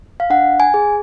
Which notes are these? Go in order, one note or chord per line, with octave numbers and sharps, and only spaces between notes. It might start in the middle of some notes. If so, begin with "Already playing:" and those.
F5
D4 F#5
G#5
G#4